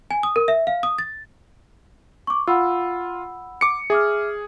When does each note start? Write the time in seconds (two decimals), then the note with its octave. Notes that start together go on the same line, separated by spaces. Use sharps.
0.11 G#5
0.23 D#6
0.36 A#4
0.48 E5
0.67 F5
0.83 D#6
0.98 A6
2.27 C#6 D6
2.48 F4 F#5 B5 E6
3.61 D6 C#7
3.90 G#4 E5 D6 F6